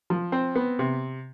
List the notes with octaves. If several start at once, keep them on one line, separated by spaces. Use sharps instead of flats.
F3
C4
B3
C3